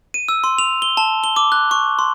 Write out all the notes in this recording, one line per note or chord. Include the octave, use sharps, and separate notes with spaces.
D#7
E6
C6
F7
G7
A5
G7
D6
F#6
C#6
C6